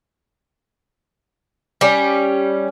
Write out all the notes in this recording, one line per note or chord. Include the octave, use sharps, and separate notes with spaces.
G3 C#4